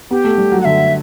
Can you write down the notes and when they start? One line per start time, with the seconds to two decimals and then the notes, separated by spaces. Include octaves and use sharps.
0.11 B3 G4
0.24 A3
0.38 G3
0.52 F#3
0.61 F#5
0.65 D3 E5